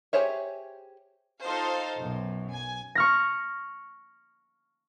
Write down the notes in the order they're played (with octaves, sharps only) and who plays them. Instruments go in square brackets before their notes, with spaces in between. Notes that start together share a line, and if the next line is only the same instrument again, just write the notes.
[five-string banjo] G4 G#4 C5 C#5 E5
[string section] D#4 F4 A4 C5 F5
B1 F#2
G#5
[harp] C#6 F6 A#6